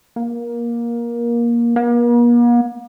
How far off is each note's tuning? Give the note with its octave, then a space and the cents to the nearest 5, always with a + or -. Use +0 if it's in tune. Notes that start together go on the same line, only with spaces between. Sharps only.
A#3 +20
A#3 +45